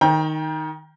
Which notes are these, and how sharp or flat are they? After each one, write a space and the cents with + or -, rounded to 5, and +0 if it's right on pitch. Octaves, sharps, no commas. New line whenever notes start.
D#3 +0 G5 +20 A#5 +35